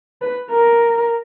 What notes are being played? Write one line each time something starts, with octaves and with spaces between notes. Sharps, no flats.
B4
A#4